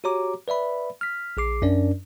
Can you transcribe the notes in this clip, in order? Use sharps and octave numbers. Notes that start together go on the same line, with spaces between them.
F#4 G4 C#5 A#5 D6
B4 D5 E5 B5
F6 B6
A#1 G#4 D6 C7
F#2 C#4 D4 A#4 D5